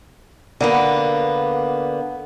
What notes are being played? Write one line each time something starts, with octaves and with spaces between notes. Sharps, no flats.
D3 A#3 B3